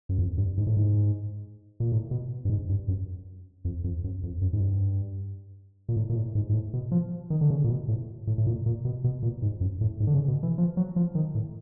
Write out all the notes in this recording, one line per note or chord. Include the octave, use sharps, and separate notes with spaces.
F#2
F2
G2
G#2
A2
G#2
A#2
A2
B2
G2
G#2
G2
F#2
F2
F2
F#2
F2
F#2
G#2
G2
A#2
A2
A#2
A2
G#2
G#2
A2
B2
F3
D#3
D3
C#3
A#2
B2
A2
A2
A2
A#2
A#2
B2
B2
A#2
G#2
F#2
A2
G#2
D3
C#3
B2
E3
F3
F#3
F3
D#3
A2